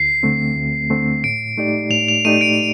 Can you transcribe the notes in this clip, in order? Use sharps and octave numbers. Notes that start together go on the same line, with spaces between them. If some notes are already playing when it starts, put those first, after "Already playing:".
Already playing: D2 C7
D3 A3 C4
D2
D3 A3 C4
A2 D7
A3 D#4 G4 D5
A2 F7
F7
A3 D#4 G4 D5 D#7
D7